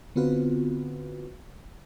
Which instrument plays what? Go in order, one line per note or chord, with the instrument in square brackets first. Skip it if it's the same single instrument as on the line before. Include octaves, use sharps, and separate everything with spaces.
[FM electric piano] D3 B3 C4 F4 F#4 B4